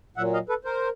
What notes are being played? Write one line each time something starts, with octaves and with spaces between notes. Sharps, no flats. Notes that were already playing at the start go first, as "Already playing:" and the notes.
A#2 F#3 E5 F#5
D#5 F5
A4 B4
A#4 C5